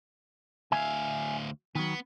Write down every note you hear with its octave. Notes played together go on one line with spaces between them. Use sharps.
D2 E5 F5 G#5
D#3 F#3 B3